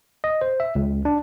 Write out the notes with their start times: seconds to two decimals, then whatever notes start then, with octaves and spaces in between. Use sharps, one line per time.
0.24 D#5
0.41 C5
0.60 E5
0.75 C#2
1.05 D4